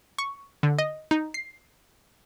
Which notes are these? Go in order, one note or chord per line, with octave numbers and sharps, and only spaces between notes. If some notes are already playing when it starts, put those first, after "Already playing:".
C#6
D3
D#5
D#4
C7